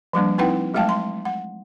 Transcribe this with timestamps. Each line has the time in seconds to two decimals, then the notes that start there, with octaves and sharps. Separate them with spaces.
0.13 F3 G3 A#3 D4
0.38 C4 D#4 E4 B4 F#5 G5
0.74 F#3 G#3 A3 F5 G5 A5
0.89 C6
1.25 F#5